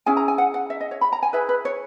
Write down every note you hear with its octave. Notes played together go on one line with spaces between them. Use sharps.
C#4 E4 G#4 G#5
A#5
G#5
F#5
F#5
E5
D#5
C#5
B5
A#5
G#5
E4 G#4 B4 E5
B4
C#5